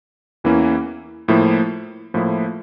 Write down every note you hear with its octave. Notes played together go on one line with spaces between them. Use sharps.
E2 E3 A#3 C#4 E4
A2 F3 A#3 E4
A2 F3 A#3 E4